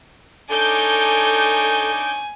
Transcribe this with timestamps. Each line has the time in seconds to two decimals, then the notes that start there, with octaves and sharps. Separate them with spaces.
0.50 D4 D#4 A4 C#5 G#5 D6 G6